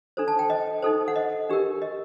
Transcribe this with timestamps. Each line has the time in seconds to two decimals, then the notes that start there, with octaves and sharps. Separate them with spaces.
0.17 D4 A4 C5
0.28 A5
0.39 G5
0.50 D#5
0.83 D#4 A4 C5
1.08 F#5
1.16 D#5
1.49 D4 G4 A#4
1.82 D#5